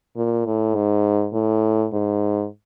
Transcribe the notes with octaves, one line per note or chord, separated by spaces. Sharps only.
A#2
A2
G#2
A2
G#2